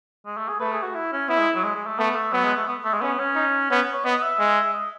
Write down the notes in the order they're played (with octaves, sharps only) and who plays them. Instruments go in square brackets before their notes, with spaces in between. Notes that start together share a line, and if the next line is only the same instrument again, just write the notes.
[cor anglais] G#3
A3
G#4
[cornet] A3 [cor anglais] B4
[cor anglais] G#4
F#4
E4
C#4
[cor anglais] B3 [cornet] E4
[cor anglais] G#3
F#3
G#3
G#3
A3
[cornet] A3 [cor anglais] B3
[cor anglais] A3
[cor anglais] F#3 [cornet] B3
[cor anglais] G#3
A3
B3
A3
G#3
[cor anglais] B3 [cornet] C#4
[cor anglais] C#4
[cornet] D#4
[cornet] B3 [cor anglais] C#4
[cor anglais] C#5
[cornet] B3 [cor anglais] D#5
[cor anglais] E5
[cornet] G#3
[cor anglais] D#5